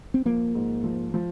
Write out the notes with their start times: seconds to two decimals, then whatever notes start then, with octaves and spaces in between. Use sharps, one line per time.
0.14 C4
0.25 F3 A#3
0.55 G#2
0.84 F3
1.14 F3